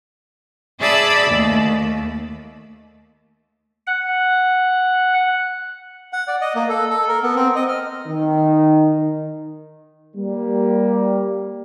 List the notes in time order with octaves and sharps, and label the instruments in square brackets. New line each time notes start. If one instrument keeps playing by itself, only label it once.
[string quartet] G#4 D5 E5 A5 B5 E6
D#2 A3
[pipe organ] F#5
[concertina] F#5
D5
D#5
A#3
A4
A4
A#4
B3
C4
D#5
F6
[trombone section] D#3
G3 A#3